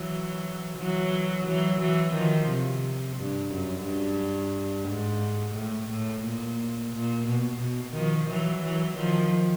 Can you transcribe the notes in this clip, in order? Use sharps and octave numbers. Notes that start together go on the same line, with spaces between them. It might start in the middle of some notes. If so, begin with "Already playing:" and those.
Already playing: E3 F#3
E3 F#3
E3 F#3
E3 F#3
D#3 F3
C3
G2
F#2
G2
G#2
A2
A2
A#2
A#2
B2
B2
D#3 F3
E3 F#3
E3 F#3
D#3 F3